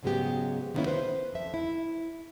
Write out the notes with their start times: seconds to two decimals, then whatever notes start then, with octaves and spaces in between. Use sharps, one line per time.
0.03 G#2 C#3 F#3 G#3 B3 G4
0.74 D#3 G3 A#3 B3 C#4 E4
0.87 B4 C5
1.33 F2 E5
1.54 E4